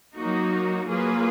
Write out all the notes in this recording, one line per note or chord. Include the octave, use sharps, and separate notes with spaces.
F#3 A#3 D#4 F#4
F#3 A#3 F4 G#4 B4